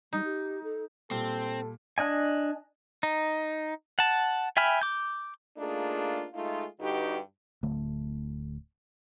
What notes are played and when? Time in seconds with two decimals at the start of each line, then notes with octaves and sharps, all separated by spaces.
0.13 G3 D#4
0.24 G4
0.63 A4
1.11 A#2 G3 C4 A4
1.98 D4 D#5 G#5
3.03 D#4
3.99 F#5 A5
4.57 E5 G5 G#5 B5 F6
4.81 D6 G6
5.58 A3 A#3 D4 D#4 F4 G#4
6.34 G#3 A3 D#4 F4
6.80 G2 D3 D#4 F#4 G4 B4
7.63 D1 D3 A3